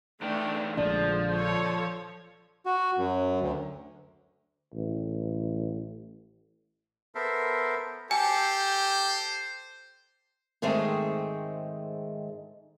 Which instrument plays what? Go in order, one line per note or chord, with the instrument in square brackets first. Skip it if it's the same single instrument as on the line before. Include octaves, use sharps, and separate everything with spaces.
[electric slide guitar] E2 D#4 G5 [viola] A3 D4
[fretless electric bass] A#1 D3 D4 [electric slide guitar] F3 [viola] G#3 [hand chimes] D5
[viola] A4 C#5
[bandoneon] F#4
F#2
D2
[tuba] A1
[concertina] B3 A4 A#4 C5 E5
[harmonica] G4 A4 [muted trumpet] C5 [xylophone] G#5
[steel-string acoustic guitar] G#2 D#3 G#3 A3 C4